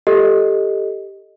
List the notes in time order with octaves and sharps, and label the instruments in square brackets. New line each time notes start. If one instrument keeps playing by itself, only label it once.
[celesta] G4 A4 D#5